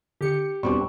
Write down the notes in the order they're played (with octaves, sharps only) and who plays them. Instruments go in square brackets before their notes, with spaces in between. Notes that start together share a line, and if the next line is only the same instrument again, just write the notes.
[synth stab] D3 C#7 [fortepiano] G4
[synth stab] E2 B2 [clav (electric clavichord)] G3 C4 D4 [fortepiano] C#6